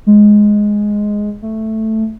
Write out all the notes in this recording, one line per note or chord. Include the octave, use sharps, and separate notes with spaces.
G#3
A3